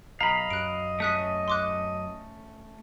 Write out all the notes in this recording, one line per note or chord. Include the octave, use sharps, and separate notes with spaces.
B1 D#5 F5 A#5 B5
F#2 F#6 D7
A3 C#4 D#6 F#6 B6
C6 D6 F#6